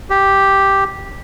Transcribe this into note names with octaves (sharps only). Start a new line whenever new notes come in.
G4